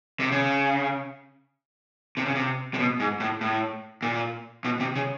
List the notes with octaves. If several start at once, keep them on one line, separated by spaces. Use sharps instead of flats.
C3
C#3
C3
C#3
C3
C3
B2
G#2
A2
A2
A#2
B2
C3
C#3